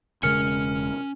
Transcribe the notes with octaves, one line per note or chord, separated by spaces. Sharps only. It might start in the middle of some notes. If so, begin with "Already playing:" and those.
E1 C#3 G#3 C#4 A#4 G#5 F6 C#7